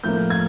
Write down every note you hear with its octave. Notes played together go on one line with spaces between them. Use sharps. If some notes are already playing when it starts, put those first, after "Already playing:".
A2 F3 A#3 G6
G#6